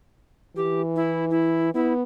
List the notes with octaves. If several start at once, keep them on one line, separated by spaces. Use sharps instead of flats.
E3 G4
E4
E4
B3 E4